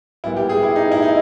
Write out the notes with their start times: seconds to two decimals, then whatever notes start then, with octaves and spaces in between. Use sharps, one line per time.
0.24 A#2 G3 B3 E4
0.36 G4
0.49 G#4
0.63 E4
0.76 D#4
0.92 E4
1.02 D#4